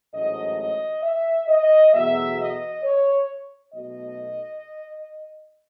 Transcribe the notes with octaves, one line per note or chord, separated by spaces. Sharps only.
A1 G#2 F#3 A3 D#5
D#5
E5
D#5
E2 B2 F#3 A3 E5
D#5
C#5
B1 B2 A3 D#5